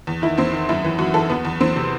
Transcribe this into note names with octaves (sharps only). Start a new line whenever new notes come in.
E2
D#3 E4
E2 C4
D#3
F#2 E4
E3
F#2 F#4
E3 A4
E2 B3
E2
E3 C4
C3